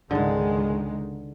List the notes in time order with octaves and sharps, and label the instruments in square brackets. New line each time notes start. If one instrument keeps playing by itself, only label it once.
[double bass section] C#2 D#3 G#3 [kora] G#2 D3